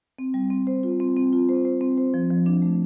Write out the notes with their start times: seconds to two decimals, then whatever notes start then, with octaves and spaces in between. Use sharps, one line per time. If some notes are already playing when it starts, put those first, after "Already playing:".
0.19 C4
0.34 G3
0.50 C4
0.67 C5
0.83 F4
1.00 C4
1.16 C4
1.33 F4
1.49 C5
1.65 C5
1.81 C4
1.97 C5
2.14 F3
2.30 F3
2.46 D4
2.62 A3